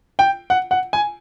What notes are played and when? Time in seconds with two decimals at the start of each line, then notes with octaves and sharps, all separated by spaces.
0.19 G5
0.50 F#5
0.71 F#5
0.93 G#5